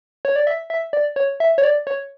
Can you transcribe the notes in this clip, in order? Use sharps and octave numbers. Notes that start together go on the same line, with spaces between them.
C#5
D5
E5
E5
D5
C#5
E5
C#5
D5
C#5